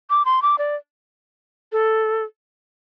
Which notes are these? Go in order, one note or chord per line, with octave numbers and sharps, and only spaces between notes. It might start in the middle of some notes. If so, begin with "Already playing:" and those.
D6
C6
D6
D5
A4